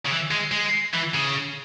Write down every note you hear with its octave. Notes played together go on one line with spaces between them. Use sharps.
C#3
E3
G#3
G#3
E3
C#3